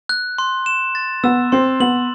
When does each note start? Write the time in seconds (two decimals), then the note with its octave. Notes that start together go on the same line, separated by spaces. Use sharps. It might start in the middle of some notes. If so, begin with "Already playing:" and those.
0.09 F#6
0.38 C6
0.66 E7
0.95 A6
1.24 B3 E6
1.52 C4 C6
1.80 B3 F#7